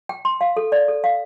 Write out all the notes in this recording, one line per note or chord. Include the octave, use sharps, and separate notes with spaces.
G5
C6
F5
A4
D5
A4
F5